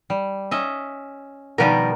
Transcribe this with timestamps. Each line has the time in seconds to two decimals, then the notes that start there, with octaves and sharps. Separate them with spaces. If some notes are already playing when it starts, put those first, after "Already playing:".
0.10 G3
0.51 C#4 D#5 E5
1.58 B2 D#3 F3 G3 A#4